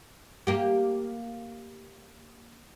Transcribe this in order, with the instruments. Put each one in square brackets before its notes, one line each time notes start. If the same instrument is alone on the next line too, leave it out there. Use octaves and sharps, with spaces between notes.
[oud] A#3 G4